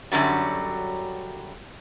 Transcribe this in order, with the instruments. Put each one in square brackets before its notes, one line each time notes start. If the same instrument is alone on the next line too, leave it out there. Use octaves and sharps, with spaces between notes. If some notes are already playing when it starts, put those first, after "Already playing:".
[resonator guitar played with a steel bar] F#2 D3 F#3 G3